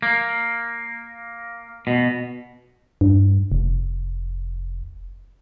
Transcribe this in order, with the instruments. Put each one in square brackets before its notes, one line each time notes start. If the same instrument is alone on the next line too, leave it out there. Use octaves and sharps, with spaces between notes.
[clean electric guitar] A#3
B2
[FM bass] G2
F1